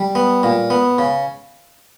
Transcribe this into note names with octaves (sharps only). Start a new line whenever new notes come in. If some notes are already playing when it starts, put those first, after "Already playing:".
Already playing: G3
B3
A#2
B3
C#3